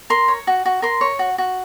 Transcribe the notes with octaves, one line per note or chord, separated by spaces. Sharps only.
A#4 C6
C#5
F#4
F#4
A#4 C6
C#5
F#4
F#4